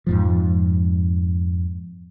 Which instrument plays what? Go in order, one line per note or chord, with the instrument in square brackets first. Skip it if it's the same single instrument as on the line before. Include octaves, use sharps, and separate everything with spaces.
[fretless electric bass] F2 G#2 F3